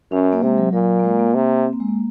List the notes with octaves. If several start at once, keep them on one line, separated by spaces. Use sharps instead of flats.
F#2 C#4
A#3
C3 G#3
F#3
A#2 F#3
A#3
G#3
A#3
C3
C4
A#3
G#3
A#3